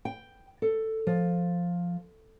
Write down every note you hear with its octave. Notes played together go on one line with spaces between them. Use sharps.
G5
A4
F3